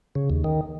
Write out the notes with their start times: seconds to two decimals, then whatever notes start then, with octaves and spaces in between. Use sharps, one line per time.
0.15 C#3
0.30 D#2
0.44 D#3